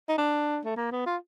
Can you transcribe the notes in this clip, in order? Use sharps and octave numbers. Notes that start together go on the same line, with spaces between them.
D#4
D4
A3
A#3
B3
F4